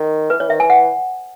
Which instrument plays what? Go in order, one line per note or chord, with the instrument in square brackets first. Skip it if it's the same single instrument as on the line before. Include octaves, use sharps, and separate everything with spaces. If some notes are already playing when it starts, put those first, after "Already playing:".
Already playing: [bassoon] D#3
[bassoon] E3 [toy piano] B4
[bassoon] E3 [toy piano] C#5
[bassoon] D#3 [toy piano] E5
[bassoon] E3 [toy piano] G#5
[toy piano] F#5